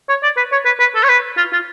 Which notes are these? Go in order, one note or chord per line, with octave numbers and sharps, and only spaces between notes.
C#5
D5
B4
C#5
B4
B4
A4
C#5
B4
F4
F4